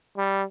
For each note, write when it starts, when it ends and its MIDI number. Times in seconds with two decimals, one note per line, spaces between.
0.17 0.43 55